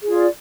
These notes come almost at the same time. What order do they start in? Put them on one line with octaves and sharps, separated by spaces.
G#4 F4 D5